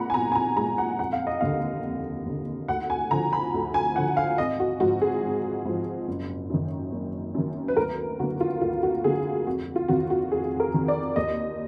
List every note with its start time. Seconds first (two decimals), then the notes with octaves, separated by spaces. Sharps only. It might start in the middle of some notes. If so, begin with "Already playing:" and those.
Already playing: A#2 G#3 F#5 A#5 B5
0.10 G#5
0.14 B1 A#5
0.32 G#5
0.35 A#5
0.57 A#2 G#3 A#5
0.78 F#5
0.99 F1 F#5
1.13 F5
1.27 D#5
1.41 D#2 D3 F5
1.84 F1
2.26 D#2 D3
2.68 D2 F#5
2.90 G#5
3.11 D3 F3 A#5
3.33 B5
3.54 D2
3.74 G#5
3.96 D3 F3 F#5
4.17 F5
4.38 G#1 D#5
4.60 F#4
4.80 G#2 F3 F#4
5.02 G#4
5.23 G#1
5.66 G#2 F3
6.08 F#1
6.50 F#2 D#3
6.92 F#1
7.35 F#2 D#3
7.68 B4
7.77 D2 A#4
8.19 D3 F#3 A#3 F#4
8.40 F4
8.61 D2 F4
8.83 F#4
9.04 D3 F#3 A#3 G#4
9.47 F1 F#4
9.76 F4
9.88 F2 D#3 F#4
10.10 F#4
10.31 F1 G#4
10.60 A#4
10.74 F2 D#3
10.88 D5
11.16 D#2 D#5